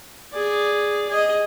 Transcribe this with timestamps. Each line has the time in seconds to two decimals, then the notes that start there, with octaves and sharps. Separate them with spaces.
0.33 G#4 D5
1.09 G#4 D#5